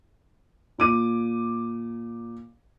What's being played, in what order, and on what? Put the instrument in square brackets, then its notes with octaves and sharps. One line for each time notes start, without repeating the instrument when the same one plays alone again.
[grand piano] A#2 D6 D#7